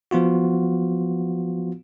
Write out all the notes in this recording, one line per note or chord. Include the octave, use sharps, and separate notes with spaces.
F3 B3 F4 F#4